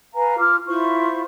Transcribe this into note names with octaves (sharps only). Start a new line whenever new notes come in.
B4 F5 G#5 A#5
F4 D6 F6
E4 F4 C5 C#6